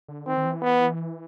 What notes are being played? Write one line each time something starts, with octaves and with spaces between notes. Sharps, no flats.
D3
D#3 C4
D#3
E3
B3